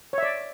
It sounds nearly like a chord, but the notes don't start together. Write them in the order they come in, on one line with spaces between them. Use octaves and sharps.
C#5 E5 D5